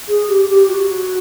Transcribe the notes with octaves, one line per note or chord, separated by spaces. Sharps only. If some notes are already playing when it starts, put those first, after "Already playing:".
G#4
G4
G4
F#4